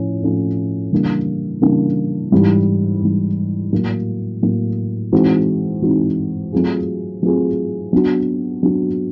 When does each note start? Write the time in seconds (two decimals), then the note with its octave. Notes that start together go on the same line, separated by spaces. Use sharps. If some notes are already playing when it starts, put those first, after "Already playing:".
Already playing: A2 F3 A3 C#4
0.22 A2 F3 A3 C#4 F4
0.92 C#3 E3 G3 A#3 D4
1.61 C#3 E3 G3 A#3 D4
2.32 G#2 E3 G3
3.02 G#2 E3 G3
3.72 A2 F#3 A#3
4.42 A2 F#3 A#3
5.12 E3 G#3 C4 D#4 F#4
5.82 E3 G#3 C4 D#4 F#4
6.52 F#3 A3 C4 F4 G#4
7.23 F#3 A3 C4 F4 G#4
7.93 F#3 B3 D4 F#4
8.63 F#3 B3 D4 F#4